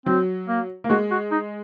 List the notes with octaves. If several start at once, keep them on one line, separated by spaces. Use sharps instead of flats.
F#3 C4
A#3
A#3
G#3 F#4
F#4
D#4